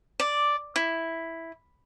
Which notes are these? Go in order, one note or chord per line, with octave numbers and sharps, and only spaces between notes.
D5
E4